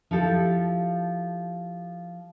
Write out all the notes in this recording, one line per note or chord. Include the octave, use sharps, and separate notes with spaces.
F3 E4 G4 A4